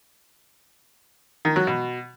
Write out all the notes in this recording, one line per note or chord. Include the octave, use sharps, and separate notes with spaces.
D#3
F#3
B2